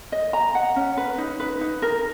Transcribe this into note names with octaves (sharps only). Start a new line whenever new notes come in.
D#5
A#5
F#5
C#4
B4
D#4
B4
D#4
A#4